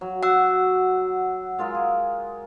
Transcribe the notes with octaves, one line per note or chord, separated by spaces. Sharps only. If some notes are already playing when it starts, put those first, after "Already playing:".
F#3
F#4 F#5 E6
G#3 F4 A#4
G#4